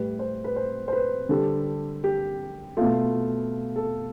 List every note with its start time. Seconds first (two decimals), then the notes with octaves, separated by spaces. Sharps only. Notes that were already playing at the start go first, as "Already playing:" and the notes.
Already playing: A2 G3 B4
0.19 C5
0.44 B4
0.56 C5
0.88 C5
0.92 B4
1.29 D3 G3 A4
2.04 G4
2.77 B2 A3 F4
3.76 A4